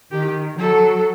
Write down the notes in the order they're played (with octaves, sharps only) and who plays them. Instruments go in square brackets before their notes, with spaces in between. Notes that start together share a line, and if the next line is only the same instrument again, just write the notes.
[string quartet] D#3 [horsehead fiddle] G4
[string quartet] F#3 [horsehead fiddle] A4